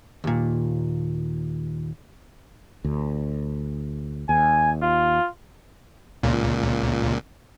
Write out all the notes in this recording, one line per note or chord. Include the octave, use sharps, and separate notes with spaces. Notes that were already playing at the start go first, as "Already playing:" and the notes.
D#2 A#2
D2
D#2 G#5
F4
C#2 A#2